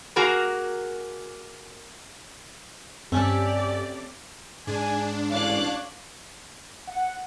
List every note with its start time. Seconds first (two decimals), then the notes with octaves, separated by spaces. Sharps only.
0.16 A#3 F#4 G#4 A#4 A#5
3.12 G2 A3 C4 C#4 G4 A4 D5
4.67 G#2 D4 G#4 G#5
5.30 A1 C#5 F5 D6 F#6
6.87 F#5